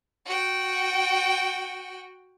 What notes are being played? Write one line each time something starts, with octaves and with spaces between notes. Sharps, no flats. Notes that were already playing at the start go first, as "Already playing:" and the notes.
F#4 G5